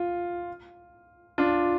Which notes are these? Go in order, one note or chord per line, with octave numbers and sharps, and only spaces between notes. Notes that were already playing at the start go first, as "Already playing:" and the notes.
Already playing: F4
D4 F4